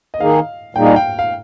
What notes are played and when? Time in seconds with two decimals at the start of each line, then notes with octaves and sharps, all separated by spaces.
0.14 D#5
0.20 D#3 A#3 D#4 G#4 F5
0.75 A#2 G3 A#3 D#4 G#4 G5
0.86 F5
0.96 G5
1.19 F5